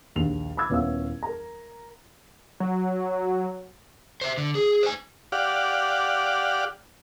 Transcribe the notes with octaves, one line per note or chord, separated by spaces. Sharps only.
A#1 D#2 F7
B5 D6 E6 G#6
D#1 B3 C#4 E4 F5 E6
A#4 A#5
F#3
C5 E5
D3
G#4
C5 G#5
G4 D5 F5 F#5